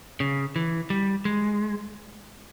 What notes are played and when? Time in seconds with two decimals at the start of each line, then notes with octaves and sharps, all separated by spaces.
0.20 C#3
0.56 E3
0.90 G3
1.25 G#3